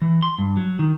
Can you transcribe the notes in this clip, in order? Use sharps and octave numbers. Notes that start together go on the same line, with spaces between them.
E3
C6
G2
F#3
D#3